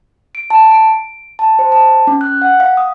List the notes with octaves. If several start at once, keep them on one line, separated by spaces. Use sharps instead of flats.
D7
A5
D7
A5
C5
A5
C#4
F#6
F#5
F5
D#6